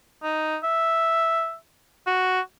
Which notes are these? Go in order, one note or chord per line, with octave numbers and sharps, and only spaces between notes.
D#4
E5
F#4